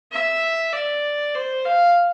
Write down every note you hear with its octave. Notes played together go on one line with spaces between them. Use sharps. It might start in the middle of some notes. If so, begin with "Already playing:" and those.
E5
D5
C5
F5